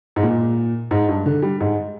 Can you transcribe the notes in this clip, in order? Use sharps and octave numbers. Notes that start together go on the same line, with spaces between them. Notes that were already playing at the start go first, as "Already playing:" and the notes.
G#2
A#2
G#2
G2
D3
G3
G#2